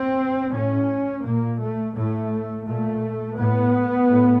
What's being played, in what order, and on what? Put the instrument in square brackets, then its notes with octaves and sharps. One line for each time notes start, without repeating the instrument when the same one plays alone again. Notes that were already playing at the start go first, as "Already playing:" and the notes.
Already playing: [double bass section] C4
A2 C#4
A#2 A#3
A3
A2 A3
A#2 A3
A2 B3
A2